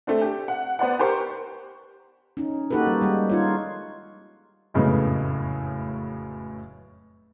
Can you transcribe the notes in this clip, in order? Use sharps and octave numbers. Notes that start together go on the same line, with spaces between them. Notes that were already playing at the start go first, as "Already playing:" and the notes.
A3 C4 D4
G4
F#5
B3 C5 D5 F#5
G4 A#4 C5 C#6
C#4 D#4
A#3 D#4 F#4 G4 A4 B4
G3
G3 G#3
D#4 F4 C#5
F1 F#2 A2 C#3 G#3 B3